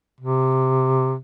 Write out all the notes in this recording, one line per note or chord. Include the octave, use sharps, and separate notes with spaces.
C3